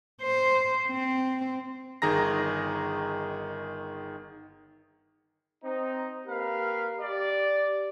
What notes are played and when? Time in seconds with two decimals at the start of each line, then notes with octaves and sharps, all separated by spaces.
0.22 C5
0.88 C4
2.02 G1 D#3 G#4 A#5 A#6
5.64 C4 D#4
6.27 A#3 G4 A#4 B4 F5
7.00 G4 D5